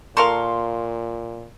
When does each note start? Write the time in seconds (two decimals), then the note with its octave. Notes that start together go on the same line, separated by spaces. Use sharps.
0.17 A#2 A4 A#4 F5 C6 C#6